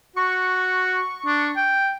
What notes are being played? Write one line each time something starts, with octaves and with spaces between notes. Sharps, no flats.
F#4 C#6
D4
G5